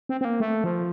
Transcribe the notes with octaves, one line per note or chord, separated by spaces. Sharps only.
C4
C4
A#3
A3
F3